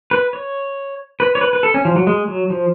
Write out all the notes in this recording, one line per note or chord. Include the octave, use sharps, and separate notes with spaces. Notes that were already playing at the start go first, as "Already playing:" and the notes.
B4
C#5
B4
C#5
B4
B4
A4
C#4
F3
F#3
G#3
F#3
F3